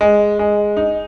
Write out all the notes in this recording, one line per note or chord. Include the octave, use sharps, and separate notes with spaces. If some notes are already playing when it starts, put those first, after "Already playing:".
G#3
G#3
D#4